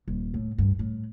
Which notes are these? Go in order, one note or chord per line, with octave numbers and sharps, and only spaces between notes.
D#1
A2
G2
A2